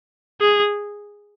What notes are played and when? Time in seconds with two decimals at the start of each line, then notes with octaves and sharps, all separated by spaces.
0.41 G#4